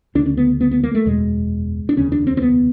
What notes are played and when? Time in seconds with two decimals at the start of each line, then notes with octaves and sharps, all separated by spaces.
0.15 D2 C#3 D4
0.26 C#4
0.37 B3
0.61 B3
0.71 B3
0.83 A#3
0.95 A3
1.05 F#1 E2 B2 G#3
1.89 D4
1.96 F1 D#2 C#3 C#4
2.12 D4
2.27 C4
2.37 C4
2.42 B3